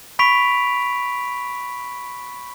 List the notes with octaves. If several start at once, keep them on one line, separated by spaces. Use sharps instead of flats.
B5 C#6 B6 D7 F7